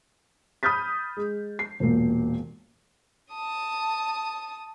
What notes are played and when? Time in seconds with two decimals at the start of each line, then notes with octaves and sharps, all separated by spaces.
0.63 B5 D#6 F6 G6 A6 B6
1.17 G#3
1.59 C7
1.80 E1 A#2
3.34 A5 D#6